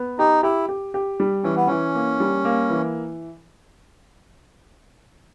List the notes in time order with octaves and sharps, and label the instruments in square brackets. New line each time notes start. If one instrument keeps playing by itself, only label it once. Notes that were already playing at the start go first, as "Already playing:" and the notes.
Already playing: [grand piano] B3
[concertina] D#4 [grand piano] G4
[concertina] E4 [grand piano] G4
[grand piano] G4
G4
G3
[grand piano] E3 [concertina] C#4
[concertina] B3
[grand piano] E3 [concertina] C#4
[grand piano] A#3
G3
A#3
E3